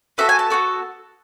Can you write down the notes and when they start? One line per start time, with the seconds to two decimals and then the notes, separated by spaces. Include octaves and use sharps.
0.18 B3 F#4 A4 E5
0.29 G#5
0.39 A5
0.50 B3 F#4 A4